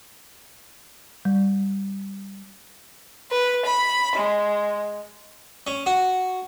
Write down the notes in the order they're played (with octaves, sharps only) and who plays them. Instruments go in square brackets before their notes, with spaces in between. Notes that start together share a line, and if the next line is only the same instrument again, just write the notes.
[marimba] G3
[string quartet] B4
B5
G#3
[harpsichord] C#4
F#4